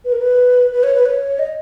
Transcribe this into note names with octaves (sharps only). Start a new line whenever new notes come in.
B4
A#4
B4
B4
C#5
B4
C#5
D#5